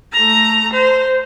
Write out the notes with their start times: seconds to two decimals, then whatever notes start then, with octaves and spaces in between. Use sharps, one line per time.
0.13 A3 A#5
0.73 C5